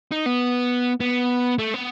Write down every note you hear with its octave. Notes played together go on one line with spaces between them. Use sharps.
D#4
B3
B3
A3
B3